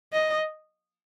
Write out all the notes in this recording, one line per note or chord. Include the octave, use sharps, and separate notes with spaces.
D#5